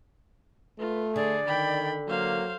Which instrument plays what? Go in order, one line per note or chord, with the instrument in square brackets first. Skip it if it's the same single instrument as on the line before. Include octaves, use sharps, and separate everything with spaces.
[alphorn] A3 [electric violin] F4 [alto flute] B4
[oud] D3 [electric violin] G#4 [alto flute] D5
[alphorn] D#3 [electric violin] G5 B5
[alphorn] F#3 [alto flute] A#3 [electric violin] C5 F5